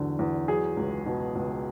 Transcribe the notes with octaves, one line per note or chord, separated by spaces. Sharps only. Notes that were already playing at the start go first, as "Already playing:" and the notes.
Already playing: E2 D3 F#3
E2
F#3 G#4
C#2
B2
C#2